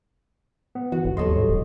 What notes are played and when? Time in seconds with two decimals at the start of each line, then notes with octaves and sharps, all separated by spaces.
0.75 B3
0.92 E3 F#4
1.05 G1
1.17 D#2 F#3 G3 A4 C#5 D#5 C6
1.36 G#2
1.49 E1